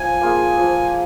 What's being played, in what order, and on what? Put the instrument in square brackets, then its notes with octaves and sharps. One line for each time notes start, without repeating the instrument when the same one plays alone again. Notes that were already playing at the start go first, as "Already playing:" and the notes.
Already playing: [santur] F3 [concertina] G#5
[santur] A#3 F4 G#4
F3